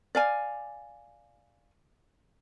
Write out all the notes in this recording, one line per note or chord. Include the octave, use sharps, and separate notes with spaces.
D5 F5 G#5